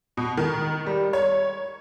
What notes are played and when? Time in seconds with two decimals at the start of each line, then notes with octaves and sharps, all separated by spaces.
0.17 B2
0.37 D#3
0.86 G3
1.13 C#5